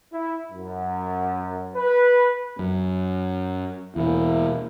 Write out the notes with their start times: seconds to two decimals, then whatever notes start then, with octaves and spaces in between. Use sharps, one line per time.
0.13 E4
0.52 F#2
1.76 B4
2.59 F#2
3.96 E2 B2 A#3 E4